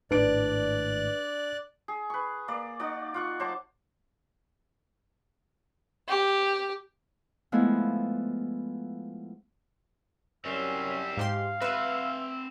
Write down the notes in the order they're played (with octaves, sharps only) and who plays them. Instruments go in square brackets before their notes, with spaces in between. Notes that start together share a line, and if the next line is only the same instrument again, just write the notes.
[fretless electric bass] G#1 A2 [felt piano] D4 D7 [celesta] B4 [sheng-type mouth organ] D5 F#6
[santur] G#4
B4 C#6
A#3 D5
D#4 F#4 D5
F4 F#5 C#6
F#3 C5 A5 D6
[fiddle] G4
[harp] F3 G#3 A3 B3 E4
[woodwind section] F#2 E6 [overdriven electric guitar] G3 C4 [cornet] C#4
[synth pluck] G#2 G4 C6 [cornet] F5
[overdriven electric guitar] C4 F#5 [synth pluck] B4 [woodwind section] E5